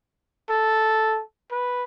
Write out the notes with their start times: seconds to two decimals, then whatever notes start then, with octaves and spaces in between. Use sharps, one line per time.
0.50 A4
1.51 B4